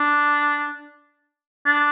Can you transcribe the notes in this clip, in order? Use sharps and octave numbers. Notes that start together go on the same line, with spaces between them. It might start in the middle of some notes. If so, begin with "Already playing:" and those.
Already playing: D4
D4